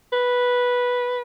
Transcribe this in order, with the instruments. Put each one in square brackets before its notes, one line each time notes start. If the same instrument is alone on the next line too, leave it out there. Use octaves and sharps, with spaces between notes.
[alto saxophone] B4